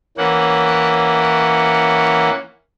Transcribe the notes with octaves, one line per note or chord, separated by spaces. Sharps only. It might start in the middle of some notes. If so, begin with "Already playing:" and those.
E3 A#3 C#4 F#5